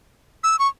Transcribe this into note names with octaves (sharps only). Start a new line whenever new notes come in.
E6
C#6